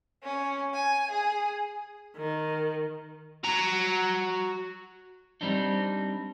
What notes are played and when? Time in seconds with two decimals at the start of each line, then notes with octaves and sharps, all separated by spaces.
0.24 C#4
0.74 G#5
1.11 G#4
2.17 D#3
3.44 F#4 A#5
5.41 G3 C4 D4 D#4